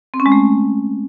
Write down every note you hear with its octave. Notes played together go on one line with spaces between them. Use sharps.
C4
C#4
G#3
A3